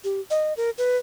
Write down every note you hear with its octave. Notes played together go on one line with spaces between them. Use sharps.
G4
D#5
A#4
B4